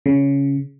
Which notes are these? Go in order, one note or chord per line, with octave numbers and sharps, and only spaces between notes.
C#3